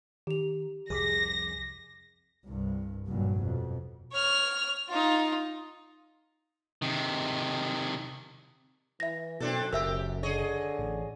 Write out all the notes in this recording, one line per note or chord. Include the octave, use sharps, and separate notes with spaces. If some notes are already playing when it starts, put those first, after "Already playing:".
D#3 G4 F7
C2 F2 G#4 D6 A#6 B6
C2 G2
F1 G2 A#2 F#3
F2 B2
C#5 F6
D#4 F4
C3 D#3
E3 E5 A#6
F#2 B2 C4 D4 A4
F#1 G4 A#4 E5 E6
D3 G#4 C#5 D#5
A1